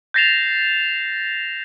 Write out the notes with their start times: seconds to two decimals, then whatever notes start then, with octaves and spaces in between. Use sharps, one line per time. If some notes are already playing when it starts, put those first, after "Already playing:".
0.14 G6 A6 A#6 C7 E7 F7